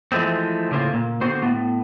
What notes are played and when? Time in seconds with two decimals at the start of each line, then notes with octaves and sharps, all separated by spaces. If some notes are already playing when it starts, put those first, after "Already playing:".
0.12 E3 F3 G#3 A3 C4
0.71 A2 C#3 A#3 C4 F4
0.93 A#2
1.21 D3 B3 C4 F#4 C5
1.42 A2 B3